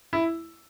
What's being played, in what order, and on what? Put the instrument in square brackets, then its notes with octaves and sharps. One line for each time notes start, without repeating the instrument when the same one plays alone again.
[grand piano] E4